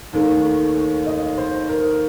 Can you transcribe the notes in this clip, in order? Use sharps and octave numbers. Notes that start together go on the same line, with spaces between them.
D#2 D#3 A3
D#5
C5
A#4